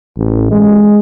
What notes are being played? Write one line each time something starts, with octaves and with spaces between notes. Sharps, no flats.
A1
G#3